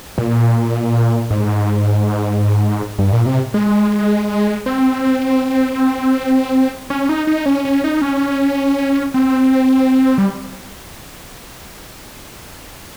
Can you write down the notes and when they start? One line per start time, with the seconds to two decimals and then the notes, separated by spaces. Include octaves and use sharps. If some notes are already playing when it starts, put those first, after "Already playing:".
0.18 A#2
1.30 G#2
2.99 G2
3.13 A#2
3.26 C3
3.54 G#3
4.66 C4
6.90 C#4
7.09 D#4
7.27 D#4
7.46 C#4
7.65 C#4
7.84 D#4
8.01 C#4
9.14 C4
10.18 G3